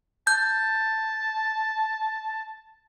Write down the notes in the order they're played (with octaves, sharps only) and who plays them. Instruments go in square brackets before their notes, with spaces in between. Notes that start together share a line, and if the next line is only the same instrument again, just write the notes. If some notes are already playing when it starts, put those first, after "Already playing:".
[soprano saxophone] A5 [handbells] G6